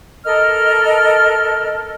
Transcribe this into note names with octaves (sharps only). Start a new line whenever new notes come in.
A4 A#4 D#5 F6